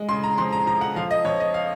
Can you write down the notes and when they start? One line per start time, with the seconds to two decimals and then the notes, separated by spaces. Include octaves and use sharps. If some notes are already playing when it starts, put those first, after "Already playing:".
Already playing: G#3
0.09 C#3 C6
0.23 A#5
0.38 F2 C6
0.53 A#5
0.67 F3 A#5
0.81 F#5
0.96 F3 F5
1.11 D#5
1.25 F2 C#5
1.40 D#5
1.54 F5